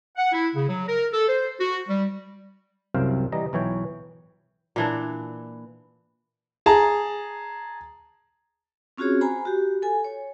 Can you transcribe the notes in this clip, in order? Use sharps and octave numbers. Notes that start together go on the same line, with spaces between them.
F#5
E4
C#3
F#3
A#4
A4
C5
F#4
G3
C2 F#2 C3 C4 F5 G5
E3 G3 D#5 A#5
B1 E3 C#5 G5
A#2 E3 D4
G#4 A5 A#5
C4 C#4 F4 F#4 G#4 C#5
C5 G#5 A#5 B5
F#4 G4
A4 G#5
C#5